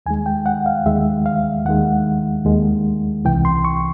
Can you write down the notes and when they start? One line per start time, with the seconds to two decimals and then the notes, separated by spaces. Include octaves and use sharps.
0.06 D#2 D#3 G#3 G#5
0.26 G5
0.46 F#5
0.66 F5
0.86 D#2 D#3 G#3 E5
1.26 F5
1.66 D#2 D#3 G#3 F#5
2.45 D#2 D#3 G#3
3.25 C2 C3 E3 G5
3.45 C6
3.65 C#6